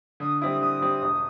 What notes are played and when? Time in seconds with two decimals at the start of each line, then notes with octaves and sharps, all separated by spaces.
0.20 D3 D#6
0.41 G3 C4 E4 D#6
0.61 D3 D#6
0.82 G3 C4 E4
1.02 E1